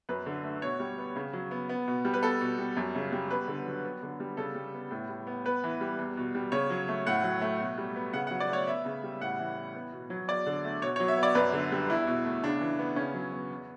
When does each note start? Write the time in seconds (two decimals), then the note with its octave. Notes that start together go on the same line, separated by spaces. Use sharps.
0.09 F#2 B4
0.26 D3
0.43 A3
0.62 B2 C#5
0.80 G3
0.98 B3
1.16 C#3
1.33 F#3
1.51 B3
1.69 B3
1.87 B2
2.05 G3
2.14 B4
2.23 B3 A4
2.41 B2
2.58 G3
2.77 F#2
2.95 C#3
3.12 G3
3.30 B3 B4
3.48 D3
3.66 F#3
3.84 B3
4.03 D3
4.20 G3
4.37 C#3 A4
4.55 G3
4.74 B3
4.91 A2
5.09 G3
5.27 B3
5.45 B3 B4
5.64 E3
5.81 G3
5.99 E2
6.17 B2
6.35 G3
6.52 C#3 C#5
6.70 F#3
6.88 A3
7.07 A2 F#5
7.23 F#3
7.41 A3
7.60 B2
7.78 G3
7.96 B3
8.13 C#3 F#5
8.27 F#5
8.31 F#3
8.40 D5
8.49 A3 C#5
8.67 B3 E5
8.85 C#3
9.03 G3
9.21 A2 F#5
9.39 E3
9.57 B3
9.75 B3
9.93 B2
10.10 F#3
10.28 E2 D5
10.46 D3
10.64 A3
10.82 B2 C#5
10.96 C#5
11.00 F#3
11.08 E5
11.18 B3 D5
11.35 F#2 B4
11.53 D3
11.72 G3
11.89 E2 E4
12.07 B2
12.25 A3
12.44 C#3 D4
12.61 E3
12.79 B3
12.96 C#3 C#4
13.14 F#3
13.33 B3
13.50 E2